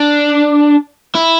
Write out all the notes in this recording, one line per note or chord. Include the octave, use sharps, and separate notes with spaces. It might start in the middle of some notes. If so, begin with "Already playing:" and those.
Already playing: D4
E4